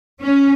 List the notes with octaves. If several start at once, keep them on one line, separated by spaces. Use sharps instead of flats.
C#4